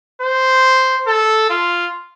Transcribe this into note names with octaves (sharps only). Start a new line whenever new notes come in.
C5
A4
F4